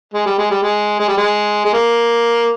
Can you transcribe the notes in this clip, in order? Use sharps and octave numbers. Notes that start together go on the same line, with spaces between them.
G#3
G3
G#3
G3
G#3
G#3
G3
G#3
G#3
A#3